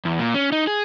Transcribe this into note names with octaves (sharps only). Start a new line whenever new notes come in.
E2
A#2
C#4
D#4
G#4